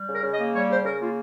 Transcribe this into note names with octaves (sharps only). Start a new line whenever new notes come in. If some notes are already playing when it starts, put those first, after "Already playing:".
Already playing: G3
C#3 A#4
C#3
D#5
A#3
G3 C#5
C#3 C5
C#3 A#4
A#3 F4